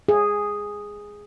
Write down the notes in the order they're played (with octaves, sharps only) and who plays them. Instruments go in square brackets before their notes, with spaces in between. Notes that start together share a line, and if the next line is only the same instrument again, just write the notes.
[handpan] G#4